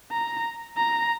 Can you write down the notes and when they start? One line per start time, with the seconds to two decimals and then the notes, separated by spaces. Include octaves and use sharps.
0.12 A#5
0.77 A#5